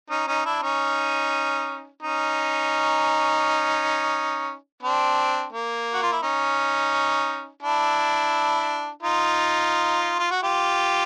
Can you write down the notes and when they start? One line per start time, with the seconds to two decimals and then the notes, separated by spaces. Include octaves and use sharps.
0.10 C#4 D#4
0.27 C#4 D#4
0.45 D4 E4
0.63 C#4 D#4
2.03 C#4 D#4
4.83 C4 D4
5.53 A#3
5.94 F#4
6.03 F4
6.13 E4
6.23 C#4 D#4
7.63 D4 E4
9.03 D#4 F4
10.19 F4
10.31 F#4
10.43 F4 G4